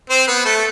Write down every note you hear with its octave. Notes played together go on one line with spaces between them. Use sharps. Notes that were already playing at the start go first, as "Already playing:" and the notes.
C4 C5
B3 B4
A3 A4